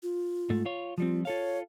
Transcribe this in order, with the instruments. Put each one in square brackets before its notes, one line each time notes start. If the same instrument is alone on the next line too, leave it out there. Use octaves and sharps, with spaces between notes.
[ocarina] F4
[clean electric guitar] G#2 A3
F4 C#5
[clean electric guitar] F3 G3 C4 [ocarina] F4
[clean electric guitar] F4 A4 F5 [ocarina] C#5